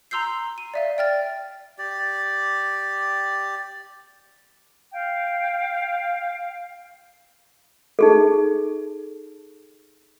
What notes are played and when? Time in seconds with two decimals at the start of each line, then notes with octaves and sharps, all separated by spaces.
0.11 A#5 C6 E6 G6 C7
0.58 D#7
0.74 D5 E5 F5
0.98 D5 G5 F6 A6
1.78 G4 D5
4.92 F5 G5
7.99 D#4 G#4 A4